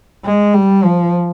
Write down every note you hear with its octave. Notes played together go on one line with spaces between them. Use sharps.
G#3
G3
F3